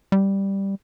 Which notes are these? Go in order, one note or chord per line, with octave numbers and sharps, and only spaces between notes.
G3